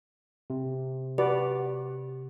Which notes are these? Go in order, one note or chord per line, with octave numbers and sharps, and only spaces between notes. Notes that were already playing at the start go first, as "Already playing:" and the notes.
C3
F#4 G4 B4 D5